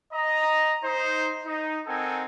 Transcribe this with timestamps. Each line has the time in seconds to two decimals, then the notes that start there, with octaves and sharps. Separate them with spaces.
0.13 D#5 A#5
0.84 D#4 C5
1.45 D#4
1.86 C4 D#4 A4 A#4 F#5 G#5